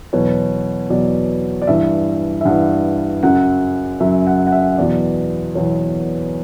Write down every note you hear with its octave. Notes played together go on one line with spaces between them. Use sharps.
E2 B2 F#3 C#5
E2 B2 F#3 D5
D5
G2 E3 E5
E5
G2 E3 F#5
F#2 C#3 F#3 F#5
F#2 C#3 F#3 E5
F#5
F#5
E5
E2 B2 F#3 D5
E2 B2 F#3 C#5